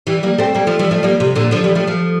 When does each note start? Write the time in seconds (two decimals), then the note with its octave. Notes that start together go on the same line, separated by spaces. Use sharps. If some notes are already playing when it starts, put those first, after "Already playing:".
0.07 E3 G3
0.23 G3 A#3
0.38 A3 C4
0.55 G3 A#3
0.67 F3 A3
0.79 E3 G3
0.91 F3 A3
1.03 G3 A#3
1.20 C3
1.35 A#2 D3
1.51 D3 F3
1.64 E3 G3
1.75 F3 A3
1.87 F3 A3